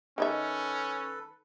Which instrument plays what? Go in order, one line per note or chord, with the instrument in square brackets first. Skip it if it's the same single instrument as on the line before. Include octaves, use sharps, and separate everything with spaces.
[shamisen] D#3 D#4 E5 [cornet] C#4 [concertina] A4 B4